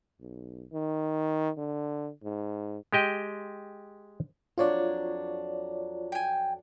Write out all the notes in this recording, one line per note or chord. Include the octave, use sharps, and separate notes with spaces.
B1
D#3
D3
G#2
G#3 G4 D#5 G5
F2 F#3 D4 F4 C#5 D5
G5 G#5